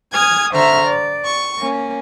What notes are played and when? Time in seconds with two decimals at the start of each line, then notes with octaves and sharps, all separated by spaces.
0.13 G#5 D#6 F6 G#6
0.54 D3 C5 E5 A#5 C#6 F6
0.89 D5
1.25 C#6
1.59 A#3 C#4